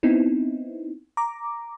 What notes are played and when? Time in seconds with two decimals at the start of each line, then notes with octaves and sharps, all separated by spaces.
0.03 B3 C4 D#4 E4
1.17 A#5 D6